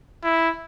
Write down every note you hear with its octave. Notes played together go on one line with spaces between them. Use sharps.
E4